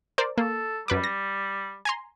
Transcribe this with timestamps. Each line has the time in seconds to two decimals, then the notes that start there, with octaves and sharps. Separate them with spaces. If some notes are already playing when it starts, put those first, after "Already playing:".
0.18 A#4 C5 D5
0.38 A#3 A4
0.88 F#2 G3 B4 D6
1.04 A#6
1.85 G#5 A#5 C6